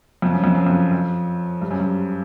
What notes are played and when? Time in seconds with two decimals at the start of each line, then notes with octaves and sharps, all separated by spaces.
0.22 F2
0.33 F#2
0.44 F2
0.55 F#2
0.67 F2
0.92 F2
1.62 G2
1.71 F#2
1.79 G2